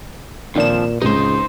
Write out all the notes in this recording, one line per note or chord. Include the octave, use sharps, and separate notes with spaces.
F2 A#2 D#3 F3 D4 E7
C#2 A2 C3 D#4 C5